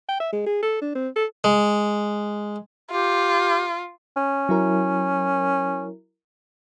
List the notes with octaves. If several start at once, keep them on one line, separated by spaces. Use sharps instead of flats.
G5
E5
G#3
G#4
A4
D4
C4
A4
G#3
F4 G4
C#4
F#3 E4 A#4